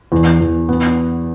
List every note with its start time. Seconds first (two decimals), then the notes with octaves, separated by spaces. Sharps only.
0.12 E2
0.40 E2
0.69 B3